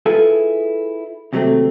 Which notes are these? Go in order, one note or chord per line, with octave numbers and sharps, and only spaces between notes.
E4 F4 G#4 A4 B4
D#2 C3 F#3 G3 A3 C4